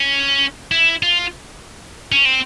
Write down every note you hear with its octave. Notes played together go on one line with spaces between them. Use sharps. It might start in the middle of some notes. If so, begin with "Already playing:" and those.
Already playing: C#4
E4
F4
C#4
C4